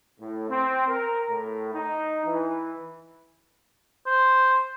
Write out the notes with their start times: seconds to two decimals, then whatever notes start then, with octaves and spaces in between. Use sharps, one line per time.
0.19 A2
0.49 C4
0.88 A#4
1.29 A2
1.73 D#4
2.26 E3
4.06 C5